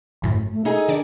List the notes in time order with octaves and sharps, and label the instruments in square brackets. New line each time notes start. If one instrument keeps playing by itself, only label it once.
[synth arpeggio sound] G1 F#2 A2
[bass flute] A3
[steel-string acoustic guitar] D#4 G#4 [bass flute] A4
[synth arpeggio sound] D#3 D5 [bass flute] D4